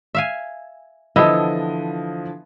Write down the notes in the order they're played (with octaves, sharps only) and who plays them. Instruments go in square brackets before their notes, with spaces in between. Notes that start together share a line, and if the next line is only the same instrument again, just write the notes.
[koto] E5 F5 G#5
[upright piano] D3 E3 F3 [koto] B3 [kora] E4 A4 [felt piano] D#5 D#6